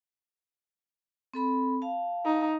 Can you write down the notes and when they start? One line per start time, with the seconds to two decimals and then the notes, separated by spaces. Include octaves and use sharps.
1.34 C4 A4 B5
1.82 F5 A5
2.25 D#4